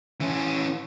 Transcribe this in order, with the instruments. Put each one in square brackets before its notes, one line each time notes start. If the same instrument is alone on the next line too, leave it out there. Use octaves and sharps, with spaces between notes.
[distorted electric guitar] E3 C#4